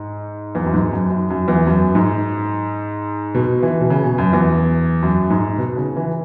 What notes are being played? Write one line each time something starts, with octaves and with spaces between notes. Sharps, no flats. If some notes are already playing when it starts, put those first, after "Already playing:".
Already playing: G#2
E2
F#2
G#2
F#2
F#2
F#2
E2
F#2
G#2
B2
E3
B2
C#3
B2
F#2
E2
F#2
G#2
B2
C#3
E3